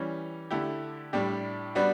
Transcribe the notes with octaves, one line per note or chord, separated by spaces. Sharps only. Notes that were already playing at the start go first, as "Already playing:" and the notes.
Already playing: E3 G3 C#4
D3 A3 E4 G4
A2 G3 D4 G4
G3 B3 D4 F#4